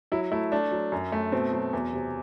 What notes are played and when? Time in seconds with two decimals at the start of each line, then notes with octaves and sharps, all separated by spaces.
0.12 F#3 E4
0.31 A3 E4
0.52 A3 D4
0.71 F#3
0.92 F#2
1.12 A3
1.32 B2 C4
1.52 F#3
1.73 E2
1.93 C3